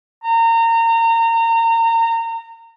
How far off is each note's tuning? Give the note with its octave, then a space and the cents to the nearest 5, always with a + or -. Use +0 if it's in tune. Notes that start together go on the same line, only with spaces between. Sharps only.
A#5 -30